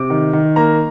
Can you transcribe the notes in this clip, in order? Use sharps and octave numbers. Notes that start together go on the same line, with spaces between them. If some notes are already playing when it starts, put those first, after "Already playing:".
Already playing: C3 D6
D#3
D#3
A#3 A#5